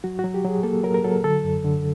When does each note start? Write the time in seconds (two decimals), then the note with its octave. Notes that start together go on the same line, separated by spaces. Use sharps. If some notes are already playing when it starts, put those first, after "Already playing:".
0.04 F#3 F#4
0.19 F#3 F#4
0.34 G4
0.45 F#3 G#4
0.63 A#3 A4
0.83 F#3 A#4
0.94 A#4
1.04 F#3 A4
1.24 D3 A4
1.44 F#2
1.64 D3